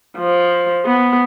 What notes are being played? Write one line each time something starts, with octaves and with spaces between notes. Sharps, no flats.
F3
B3